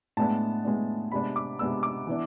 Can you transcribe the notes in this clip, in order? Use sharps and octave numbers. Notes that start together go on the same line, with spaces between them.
A2 G#3 B3 D4 A5
A2 G#3 B3 D4
C3 G#3 B3 D4 B5
D6
C3 G#3 B3 D4 E6
D6
E3 B3 D4